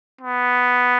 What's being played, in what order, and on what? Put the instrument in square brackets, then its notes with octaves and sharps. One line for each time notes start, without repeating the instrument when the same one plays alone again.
[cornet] B3